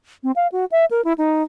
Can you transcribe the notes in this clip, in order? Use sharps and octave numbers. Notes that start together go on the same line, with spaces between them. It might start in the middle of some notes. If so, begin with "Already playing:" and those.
C4
F5
F#4
E5
A#4
E4
D#4